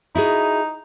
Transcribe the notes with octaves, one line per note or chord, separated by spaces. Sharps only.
D#4 E4 F#4 G#4